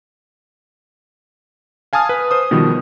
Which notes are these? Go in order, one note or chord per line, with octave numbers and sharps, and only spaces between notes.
F5 G#5 A5 D#6 F6
B4
C5 D#6
B2 D#3 F3 G3